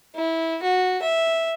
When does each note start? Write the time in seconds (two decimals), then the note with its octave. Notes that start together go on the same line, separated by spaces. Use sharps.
0.16 E4
0.63 F#4
1.02 E5